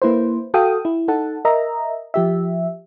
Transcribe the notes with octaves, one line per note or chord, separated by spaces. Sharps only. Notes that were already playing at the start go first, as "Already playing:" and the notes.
A#3 E4 B4 C5
F#4 A4 F5 G5 D#6
E4
D#4 A4 F#5 A5
A#4 D#5 E5 A#5
F3 G4 E5